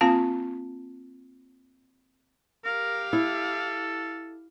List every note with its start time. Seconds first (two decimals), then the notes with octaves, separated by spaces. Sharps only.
0.01 A#3 C4 F4 F5 A5
2.65 G4 A#4 F5
3.13 E4 A4